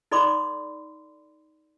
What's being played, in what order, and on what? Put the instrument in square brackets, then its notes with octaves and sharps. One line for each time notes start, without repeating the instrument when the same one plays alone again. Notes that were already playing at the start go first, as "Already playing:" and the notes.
[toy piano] D#4 A4 D5 B5 C6 D6